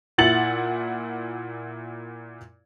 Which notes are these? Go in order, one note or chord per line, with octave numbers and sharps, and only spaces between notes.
A#2 E4 F#5 A6 C#7 F#7